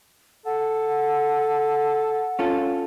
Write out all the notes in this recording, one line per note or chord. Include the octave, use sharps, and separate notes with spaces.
A4 F#5
C#4 F4 A4